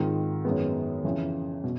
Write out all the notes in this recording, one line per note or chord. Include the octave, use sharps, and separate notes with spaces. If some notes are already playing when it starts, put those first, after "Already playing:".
Already playing: G#2 D#3 G#3 C4 F4
F#2 D#3 G#3 B3
F2 C#3 E3
B2